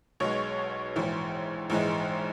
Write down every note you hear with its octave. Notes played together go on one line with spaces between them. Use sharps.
B1 B2 G#3 C#5
A#1 G#2 E3
A#1 G#2 E3 G#3